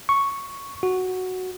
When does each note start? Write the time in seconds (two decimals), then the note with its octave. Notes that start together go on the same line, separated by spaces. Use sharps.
0.09 C#6
0.83 F#4